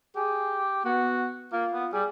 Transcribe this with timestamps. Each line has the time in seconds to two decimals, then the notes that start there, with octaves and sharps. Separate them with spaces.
0.16 G4 G#4
0.85 B3 F#4
1.52 A#3 F4
1.73 B3
1.93 G3 G#4